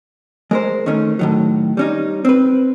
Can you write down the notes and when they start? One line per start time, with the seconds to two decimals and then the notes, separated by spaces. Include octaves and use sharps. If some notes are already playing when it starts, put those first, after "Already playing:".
0.51 G#3 A#4 C5
0.86 D#3 A3 C#4 D#4
1.19 A2 D#3 F#3
1.77 G3 C#4 D#4
2.25 C4 B4